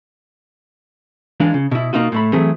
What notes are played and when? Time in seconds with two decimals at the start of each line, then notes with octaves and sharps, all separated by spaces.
1.40 E3 G#3 D4 F4
1.54 C#3
1.71 B2 E4
1.93 B2 A#3 D#4 F4 F#4
2.12 A2 A3 B5
2.33 E3 F#3 A3 C4 G#4